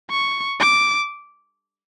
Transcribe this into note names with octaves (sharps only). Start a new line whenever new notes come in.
C#6
D6